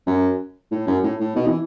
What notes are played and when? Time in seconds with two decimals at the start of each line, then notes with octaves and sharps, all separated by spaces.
0.07 F#2
0.71 A2
0.87 F#2
1.04 A2
1.20 A2
1.36 B2
1.47 E3